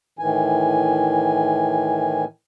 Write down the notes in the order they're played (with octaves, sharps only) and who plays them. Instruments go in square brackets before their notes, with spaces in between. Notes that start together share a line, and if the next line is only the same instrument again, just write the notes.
[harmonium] A2 D#3 E3 G#5